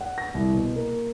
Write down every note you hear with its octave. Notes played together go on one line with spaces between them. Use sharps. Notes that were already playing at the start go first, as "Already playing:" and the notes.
F#5
A#6
C2
B2
A#3